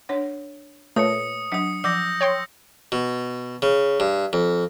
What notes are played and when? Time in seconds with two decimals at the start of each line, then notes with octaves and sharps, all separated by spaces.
0.09 D4 C#5 F#5
0.96 A#2 A3 B4 C#5 D#6 C#7
1.52 F#3 D4 F#5 D#6 C#7
1.84 F3 F#5 D6 E6 G6 A#6
2.21 C#5 G5 C6
2.92 B2
3.62 C#3
4.00 G2
4.33 F2